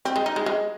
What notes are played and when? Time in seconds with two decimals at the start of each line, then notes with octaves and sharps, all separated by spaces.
0.05 C4
0.16 G#3
0.26 D#4
0.36 G#3
0.46 G#3